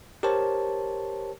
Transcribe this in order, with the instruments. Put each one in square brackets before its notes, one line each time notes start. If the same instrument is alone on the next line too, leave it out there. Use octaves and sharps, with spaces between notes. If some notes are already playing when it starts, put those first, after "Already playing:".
[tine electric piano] G4 A#4 C5 C#5 A5